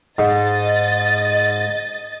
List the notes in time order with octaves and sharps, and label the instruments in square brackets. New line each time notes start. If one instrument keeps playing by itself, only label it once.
[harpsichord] G#2 [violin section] D#5 A6